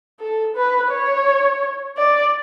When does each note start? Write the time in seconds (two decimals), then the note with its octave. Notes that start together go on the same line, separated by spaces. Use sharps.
0.20 A4
0.56 B4
0.91 C#5
1.97 D5